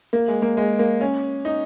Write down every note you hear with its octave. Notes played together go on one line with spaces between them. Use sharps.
A#3
G#3
A#3
G#3
A#3
C#4
D#4